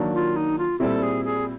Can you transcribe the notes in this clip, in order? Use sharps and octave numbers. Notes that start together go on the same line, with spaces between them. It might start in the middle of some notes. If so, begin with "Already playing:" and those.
Already playing: D#3 F#3 A#3 D4
F4
D#4
F4
A#2 G3 C4 E4 A4
G#4
G#4